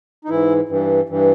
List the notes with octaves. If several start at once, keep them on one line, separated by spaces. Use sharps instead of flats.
D#4
G#2 E3 E4
G2 E3
G2 E3